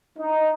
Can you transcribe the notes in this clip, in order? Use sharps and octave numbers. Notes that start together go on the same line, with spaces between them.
D#4